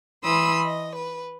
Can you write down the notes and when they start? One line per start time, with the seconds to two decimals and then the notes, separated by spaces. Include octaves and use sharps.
0.24 E3 B5 C6 D#6 E6
0.65 D#5
0.95 B4